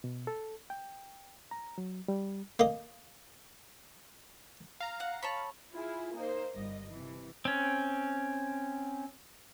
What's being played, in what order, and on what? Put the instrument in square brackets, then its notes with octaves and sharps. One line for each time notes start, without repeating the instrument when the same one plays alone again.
[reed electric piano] B2
A4
G5
A#5
F#3
G3
[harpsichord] A#3 D#5
[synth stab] F5 A#5
[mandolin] F#5
A4 C#5 B5
[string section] E4 F4 G#4
A#3 D#4 C5
G1 G3 D#5
C3 E3
[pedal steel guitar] C4 C#4